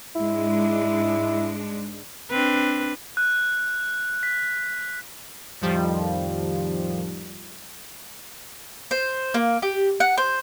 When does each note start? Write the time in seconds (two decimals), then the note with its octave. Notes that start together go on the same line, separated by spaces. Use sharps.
0.16 G#2 G#3 D4 E4
2.30 C4 D4 B4
3.17 F#6
4.23 B6
5.61 F2 A2 D#3 F3 G3
8.91 C5
9.34 A#3
9.62 G4
10.00 F#5
10.18 C5